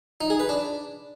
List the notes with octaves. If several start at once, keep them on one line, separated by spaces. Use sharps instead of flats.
D#4
G#4
B4
D4